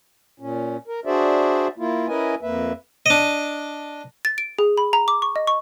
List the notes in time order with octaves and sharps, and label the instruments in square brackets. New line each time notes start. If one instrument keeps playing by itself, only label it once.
[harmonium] A#2 C#4
A#4
D4 F#4 G#4 C5 D5 E5
A#3 E4 F4
C#4 E4 A#4 B4 D#5 G#5
F2 A#3 B4 E5
[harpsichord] D4 D#5
[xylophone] A6
D7
G#4
B5
A#5
D6
C#6
D#5
C#6